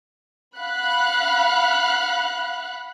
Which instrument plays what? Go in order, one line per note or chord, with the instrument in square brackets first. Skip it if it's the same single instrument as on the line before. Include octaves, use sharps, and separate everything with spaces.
[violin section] F5 F#5 B5 F#6